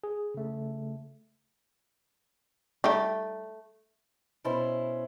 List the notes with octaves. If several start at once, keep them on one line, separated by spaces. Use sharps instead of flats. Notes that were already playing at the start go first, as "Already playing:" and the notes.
G#4
C#3 A3
G3 A3 D#4 G4
B2 C#4 E4 C5